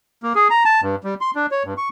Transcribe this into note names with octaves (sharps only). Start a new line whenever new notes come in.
A#3
G#4
A#5
A5
G2
G3
C6
D4
C#5
G2
C#6